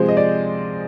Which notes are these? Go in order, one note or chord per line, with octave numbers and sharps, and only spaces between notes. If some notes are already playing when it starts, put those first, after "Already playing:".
Already playing: C3 F3 G#3 G#4 C5
D#5
D5